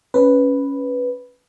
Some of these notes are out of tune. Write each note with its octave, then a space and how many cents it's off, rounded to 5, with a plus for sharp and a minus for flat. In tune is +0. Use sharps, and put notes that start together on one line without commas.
C#4 +0 B4 +0